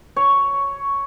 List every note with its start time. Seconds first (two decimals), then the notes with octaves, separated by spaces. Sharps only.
0.16 C#5